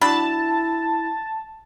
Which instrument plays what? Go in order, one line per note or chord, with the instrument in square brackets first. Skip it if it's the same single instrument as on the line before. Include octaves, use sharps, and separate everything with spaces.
[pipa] F#3 D4 B5 [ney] E4 [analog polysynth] A5